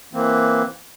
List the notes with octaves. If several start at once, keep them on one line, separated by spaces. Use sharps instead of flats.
E3 A#3 C4